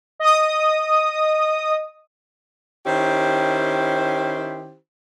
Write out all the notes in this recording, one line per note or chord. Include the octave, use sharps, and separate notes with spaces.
D#5 D#6
D#3 C#4 E4 G4 C5